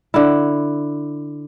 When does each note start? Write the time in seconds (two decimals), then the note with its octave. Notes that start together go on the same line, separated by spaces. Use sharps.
0.14 D3 E4